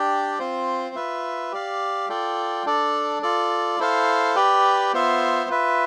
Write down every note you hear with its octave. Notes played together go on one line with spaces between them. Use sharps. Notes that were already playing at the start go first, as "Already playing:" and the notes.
Already playing: D4 G4 D5 G5
C4 F4 C5
F4 B4 E5
G4 D5 F5
F4 A4 D5 G5
D4 A4 D5
F4 A4 D5
E4 A4 C5 F5
G4 B4 D5 G5
B3 F4 C5 E5
F4 B4 E5